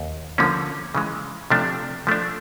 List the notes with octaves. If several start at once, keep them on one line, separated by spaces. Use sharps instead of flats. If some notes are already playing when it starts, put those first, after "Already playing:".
Already playing: D#2
D3 F3 A#3 C#4
C#3 E3 G#3
C3 F3 A3 D4
F3 A3 D4